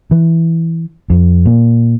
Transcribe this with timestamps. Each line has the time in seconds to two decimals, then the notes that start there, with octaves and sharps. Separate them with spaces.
0.11 E3
1.10 F2
1.45 A#2